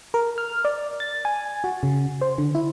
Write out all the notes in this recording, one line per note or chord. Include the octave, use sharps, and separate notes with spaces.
A#4
F6
D5
A6
G#5
F#4
C#3
C5
D3
E4